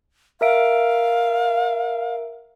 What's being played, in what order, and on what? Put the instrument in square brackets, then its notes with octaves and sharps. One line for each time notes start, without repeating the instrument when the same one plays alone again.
[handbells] A#4 E5 D7 [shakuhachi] F5